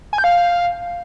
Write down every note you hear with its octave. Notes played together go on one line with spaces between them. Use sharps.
G#5
G6
F5